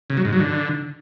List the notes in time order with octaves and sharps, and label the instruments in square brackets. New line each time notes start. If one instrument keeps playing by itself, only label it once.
[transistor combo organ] C#3
F#3
G#2
F#3
D3